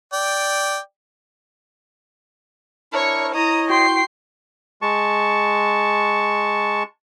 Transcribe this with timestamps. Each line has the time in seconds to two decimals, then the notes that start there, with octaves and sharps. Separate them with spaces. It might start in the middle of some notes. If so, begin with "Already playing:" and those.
0.13 D5 G5
2.93 D4 E4 A#4 C#5 C#6
3.34 E4 C#5 D#5 A#5 D#6
3.70 F#4 G5 C6 C7
4.82 G#3 A5 C#6